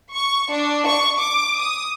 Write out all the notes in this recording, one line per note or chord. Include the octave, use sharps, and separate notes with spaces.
C#6
D4
C#6
D6
D#6